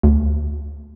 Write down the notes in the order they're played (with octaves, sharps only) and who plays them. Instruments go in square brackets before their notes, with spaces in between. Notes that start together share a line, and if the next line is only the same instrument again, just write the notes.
[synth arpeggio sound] D2